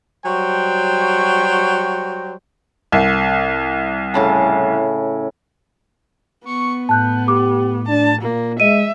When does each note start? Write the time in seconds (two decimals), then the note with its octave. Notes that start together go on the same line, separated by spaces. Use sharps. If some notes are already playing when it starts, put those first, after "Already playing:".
0.24 F#3 G3 F#4 C5 G5
2.92 C2
4.14 A2 C#3 A5
6.45 B3 C#6
6.89 A2 A5 F#6 G6
7.28 G4 D6
7.89 D4 A5
8.22 A#2 A#3
8.60 G#3 D#5 E5 D#7